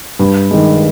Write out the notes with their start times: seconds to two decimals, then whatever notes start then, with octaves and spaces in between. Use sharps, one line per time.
0.19 G2
0.51 D#3 G#3